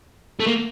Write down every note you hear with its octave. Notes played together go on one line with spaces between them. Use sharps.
A3
A#3